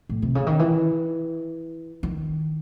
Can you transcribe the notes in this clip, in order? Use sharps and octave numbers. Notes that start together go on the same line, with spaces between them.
A2
C3
C#3
D#3
E3
D#3